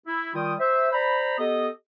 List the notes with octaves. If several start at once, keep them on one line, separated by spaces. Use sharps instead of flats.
E4
D#3 G3 F4 G5 D#6
C5 E5
C5 D5 A#5 B5
B3 G4 A4 D#5